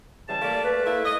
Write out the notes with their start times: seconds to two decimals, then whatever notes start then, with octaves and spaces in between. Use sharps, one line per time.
0.28 C#3 E3 G3 A5
0.42 A3 A#3 D5
0.64 B4
0.85 A3 A#3 E4
1.04 D#5